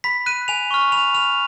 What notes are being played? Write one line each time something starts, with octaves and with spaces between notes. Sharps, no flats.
B5 B6
F#6 D#7
G#5 F7
C#6 F6
B5 F7
F6 F7